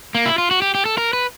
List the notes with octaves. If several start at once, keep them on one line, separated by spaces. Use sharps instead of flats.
A#3
E4
F4
F#4
G4
G4
A4
A#4
B4